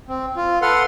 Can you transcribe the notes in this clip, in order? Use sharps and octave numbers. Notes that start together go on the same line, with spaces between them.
C4
F4
A4 B4 F#5 C6 F6